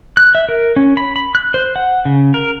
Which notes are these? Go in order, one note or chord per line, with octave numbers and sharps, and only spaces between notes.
F#6
E5
A#4
C#4
B5
B5
F#6
C5
F#5
C#3
A#4